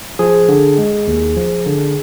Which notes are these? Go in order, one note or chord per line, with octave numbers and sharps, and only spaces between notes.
F3 G#4
D3
G#3
D#2
F3
D3